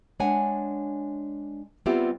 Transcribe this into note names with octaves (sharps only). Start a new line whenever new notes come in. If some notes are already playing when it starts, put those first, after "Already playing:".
G#3 D4 C#5 F#5 G#5
G3 B3 C4 F4 G4 E5